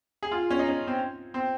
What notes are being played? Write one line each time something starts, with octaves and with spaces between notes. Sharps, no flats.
G#4
F4
C#4
D#4
C#4
C4
C4